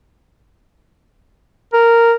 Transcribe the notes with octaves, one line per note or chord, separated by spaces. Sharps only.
A#4